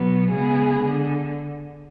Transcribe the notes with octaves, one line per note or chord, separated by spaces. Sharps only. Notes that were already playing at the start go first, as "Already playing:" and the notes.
Already playing: B2 F#3 B3
C#3 G#3 B3 G#4
D3